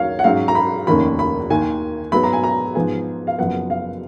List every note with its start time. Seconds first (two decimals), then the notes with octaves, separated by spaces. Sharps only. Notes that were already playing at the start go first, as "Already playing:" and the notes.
Already playing: D#2 D#3 F#3 C#4 C#5 F5
0.19 F#5
0.24 G#2 F#3 C#4 F5
0.48 A#5
0.55 B5
0.87 F1 D#2 D#3 A#3 C#4 B5
1.19 B5
1.50 D#2 D#3 A#3 G#5
2.12 G#2 F#3 B3 B5
2.23 A#5
2.33 G#5
2.43 A#5
2.75 G#2 F3 B3 G#5
3.27 F5
3.38 F#1 F#2 F3 B3 F#5
3.70 F5